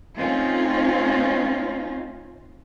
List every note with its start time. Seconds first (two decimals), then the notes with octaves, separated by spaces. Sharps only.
0.17 A3 C4 C#4 D#4 F4